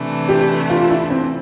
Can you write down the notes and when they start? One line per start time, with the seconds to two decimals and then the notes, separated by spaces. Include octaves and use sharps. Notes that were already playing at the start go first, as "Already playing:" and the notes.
Already playing: C3 E3 A3 D4
0.29 G4
0.70 F4
0.90 E4
1.10 C4